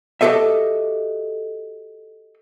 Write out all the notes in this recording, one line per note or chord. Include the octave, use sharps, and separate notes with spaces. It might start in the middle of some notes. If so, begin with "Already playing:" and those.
F#4 G4 A4 D#5 E5